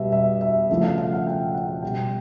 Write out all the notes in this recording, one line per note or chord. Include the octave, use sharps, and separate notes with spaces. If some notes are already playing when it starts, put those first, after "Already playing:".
Already playing: B2 G3 E5
E5
E5
C#3 F3 A3 E5
F5
F5
F#5
G5
F#5
B2 G3 G5